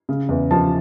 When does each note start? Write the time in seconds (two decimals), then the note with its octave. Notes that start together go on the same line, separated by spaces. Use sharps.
0.09 C#3
0.29 E2
0.51 F3 A5